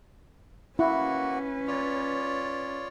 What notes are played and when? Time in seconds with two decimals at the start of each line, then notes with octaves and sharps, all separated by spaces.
0.79 A#3 C#4 E4 F#4 B4 F#5
1.68 F4 C#5 D5